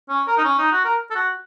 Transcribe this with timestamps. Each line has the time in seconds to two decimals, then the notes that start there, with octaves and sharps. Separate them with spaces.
0.09 C#4
0.27 A#4
0.38 D#4
0.45 C#4
0.58 D#4
0.72 F#4
0.85 A#4
1.11 A4
1.15 F#4